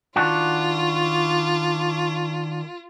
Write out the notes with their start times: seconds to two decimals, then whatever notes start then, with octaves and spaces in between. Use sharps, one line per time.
0.16 D#3 D4 F4 F#4